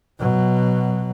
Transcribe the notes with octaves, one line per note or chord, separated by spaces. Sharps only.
B2 F#3